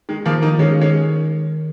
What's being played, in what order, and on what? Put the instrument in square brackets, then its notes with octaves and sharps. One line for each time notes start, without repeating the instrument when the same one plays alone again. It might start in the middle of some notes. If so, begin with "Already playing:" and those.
[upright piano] D#3 G#3
[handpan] D#3 [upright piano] F3 A#3
[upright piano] A#3 D#4
[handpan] D#3 [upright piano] G#3 C#4
[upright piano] G#3 C#4